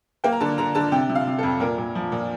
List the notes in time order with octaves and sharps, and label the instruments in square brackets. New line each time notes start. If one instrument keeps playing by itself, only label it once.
[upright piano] A#3 G5
A#5
D3 A5
D3 A#5
D3 A5
C3 G5
C3
F5
C3
A4
F2
A#2 A#4
A#2
F3
A#2